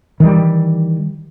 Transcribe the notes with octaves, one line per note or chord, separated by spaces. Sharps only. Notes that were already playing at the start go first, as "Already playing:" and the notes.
D#3 E3 G3